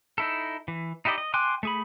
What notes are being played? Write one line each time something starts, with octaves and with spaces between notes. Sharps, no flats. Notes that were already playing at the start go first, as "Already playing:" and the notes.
D#4 E4 A4
E3
D#4 E4 G4 D5 D#5
D#5
G5 G#5 C6 D6 F#6
A3 G#4 B5